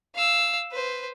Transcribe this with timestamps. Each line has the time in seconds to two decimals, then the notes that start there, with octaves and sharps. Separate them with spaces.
0.15 F5 E6
0.72 B4 C5